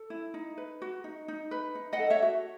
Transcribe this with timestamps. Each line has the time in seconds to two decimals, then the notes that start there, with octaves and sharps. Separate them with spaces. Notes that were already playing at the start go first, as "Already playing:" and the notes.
Already playing: A4
0.10 E4
0.34 D#4
0.57 B4
0.82 F#4
1.04 D#4
1.28 D#4
1.51 B4
1.75 D#4
1.93 D#5 F#5
1.99 A4
2.10 C#5 E5
2.22 F#4